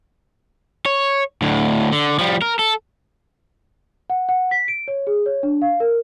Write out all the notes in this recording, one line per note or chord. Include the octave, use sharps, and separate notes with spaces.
C#5
D2 A2
D3
F3 G3
A#4
A4
F#5
F#5
B6
D7
C#5
G#4
C#5
D4
F5
A#4